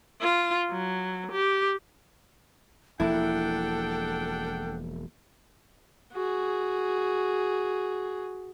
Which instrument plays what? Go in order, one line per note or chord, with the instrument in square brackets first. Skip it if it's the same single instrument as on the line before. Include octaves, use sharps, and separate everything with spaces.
[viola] F4
F#3
G4
[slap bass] E1 F3 A#3 [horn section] D4 F#5 G5 [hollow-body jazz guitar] E4 [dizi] A4
[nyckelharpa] F#4 G#4